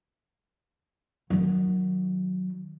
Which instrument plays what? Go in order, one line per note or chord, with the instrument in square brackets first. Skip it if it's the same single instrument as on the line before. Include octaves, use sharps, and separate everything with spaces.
[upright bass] D#3 F#3